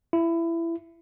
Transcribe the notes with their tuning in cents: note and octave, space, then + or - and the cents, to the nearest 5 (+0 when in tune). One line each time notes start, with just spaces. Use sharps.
E4 +20